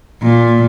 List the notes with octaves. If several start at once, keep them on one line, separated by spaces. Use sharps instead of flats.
A#2